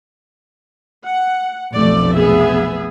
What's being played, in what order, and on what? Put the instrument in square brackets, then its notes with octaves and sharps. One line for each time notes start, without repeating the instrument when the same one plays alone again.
[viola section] F#5
[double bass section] F1 B1 [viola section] A3 D5
[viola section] B3 G#4 E5